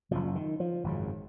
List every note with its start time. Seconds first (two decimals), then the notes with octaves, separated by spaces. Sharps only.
0.11 F#1 F#2 C#3 F3
0.36 D#3
0.60 F3
0.84 G#1 F#2 C#3